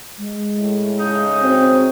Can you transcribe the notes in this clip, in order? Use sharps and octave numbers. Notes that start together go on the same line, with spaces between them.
G#3
A2
C#3 D#4
C4 F#4